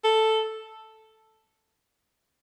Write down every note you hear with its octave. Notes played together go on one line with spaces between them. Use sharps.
A4